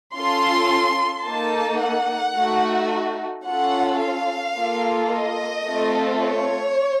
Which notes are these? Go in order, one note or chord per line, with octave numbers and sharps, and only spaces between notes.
C#4 F4 A4 C6
A#3 D#4 A4 A5
F#5
A3 D#4 F#4
C#4 F4 A4 F#5
F5
A#3 F4 A4
D#5
A3 C4 F4 A4
C#5